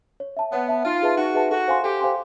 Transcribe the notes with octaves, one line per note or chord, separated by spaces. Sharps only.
C#5
E5 A5
B3 C#5
E5 A5
D#4 F4
G#4 B4 E5 A5
D#4 F#4
G#4 B4 E5 A5
F#4 A4
C5 F5 G#5 C6
G4 A4
C5 F5 G#5 C6